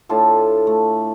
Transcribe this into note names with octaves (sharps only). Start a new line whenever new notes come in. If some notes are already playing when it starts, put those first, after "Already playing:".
A2 D4 F4 A5
A3